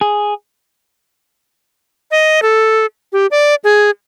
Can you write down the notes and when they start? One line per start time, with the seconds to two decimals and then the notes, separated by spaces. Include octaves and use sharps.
0.01 G#4
2.11 D#5
2.42 A4
3.13 G4
3.31 D5
3.64 G#4